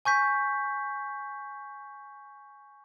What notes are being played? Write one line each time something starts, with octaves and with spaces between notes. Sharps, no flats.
G#5 C#6 G6 B6